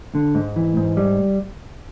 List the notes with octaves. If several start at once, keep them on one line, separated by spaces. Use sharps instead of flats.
D3
G#2
E3
G#2
G3